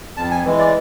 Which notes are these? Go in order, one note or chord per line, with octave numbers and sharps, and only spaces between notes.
F2 A5
G#5
E3 G#3
D5